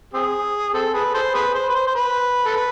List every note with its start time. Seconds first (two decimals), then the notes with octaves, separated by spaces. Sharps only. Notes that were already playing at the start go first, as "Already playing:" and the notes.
0.14 C4 G#4
0.74 C4 A4
0.94 G#4 B4
1.15 A4 C5
1.35 G#4 B4
1.55 C5
1.69 B4
1.75 C5
1.87 C5
1.95 B4
2.45 A4
2.56 B4